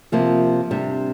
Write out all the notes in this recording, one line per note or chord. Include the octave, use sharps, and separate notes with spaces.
C3 F3 A#3 F4
C3 G3 D4